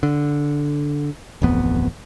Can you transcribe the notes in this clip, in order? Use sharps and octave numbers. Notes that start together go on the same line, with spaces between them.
D3
D1 A1 F2 B3